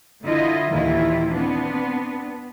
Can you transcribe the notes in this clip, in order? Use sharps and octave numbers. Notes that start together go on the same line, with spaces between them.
D3 E4 F4 D#5
D#2 A#2 D#3 E3 E4 F4
B3 C4 D4